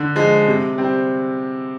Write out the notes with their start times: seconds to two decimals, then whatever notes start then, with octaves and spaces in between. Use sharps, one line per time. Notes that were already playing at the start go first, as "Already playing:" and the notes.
Already playing: D3
0.16 F3 G#3
0.47 C3
0.78 G3 C4